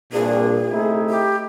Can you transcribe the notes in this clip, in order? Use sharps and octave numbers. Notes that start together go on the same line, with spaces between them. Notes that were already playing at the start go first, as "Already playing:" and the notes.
C2 G2 A#2 D4 G#4
C3 A3 D#4 E4
G4